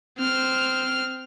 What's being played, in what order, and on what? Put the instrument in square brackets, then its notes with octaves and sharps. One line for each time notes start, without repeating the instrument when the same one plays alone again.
[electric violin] C4 F6